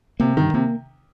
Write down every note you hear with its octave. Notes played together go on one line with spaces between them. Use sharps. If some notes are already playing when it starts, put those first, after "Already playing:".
C3 A#3
G2 D#3
C3 A#3